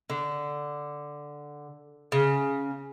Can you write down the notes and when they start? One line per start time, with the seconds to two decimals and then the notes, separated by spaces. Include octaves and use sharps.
0.10 D3
2.12 C#3